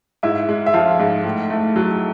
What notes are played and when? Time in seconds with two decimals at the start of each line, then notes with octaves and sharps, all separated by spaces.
0.23 G#2 E4 E5
0.49 G#3
0.66 E5
0.74 F3 F4 F5
0.99 G#2
1.25 A2
1.50 A3
1.76 F#3